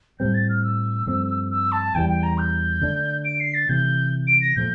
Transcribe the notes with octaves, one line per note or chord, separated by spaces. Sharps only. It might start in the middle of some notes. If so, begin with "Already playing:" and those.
A2 G3 C4 G6
A6
F6
E6
G2 F3 A3 C4
E6
A5
E2 E3 G3 G5
G5
A#5
G6
D3 A3 D4
D7
C7
A6
C3 E3 A3 G6
D7
A#6
A#2 F3 A3 G6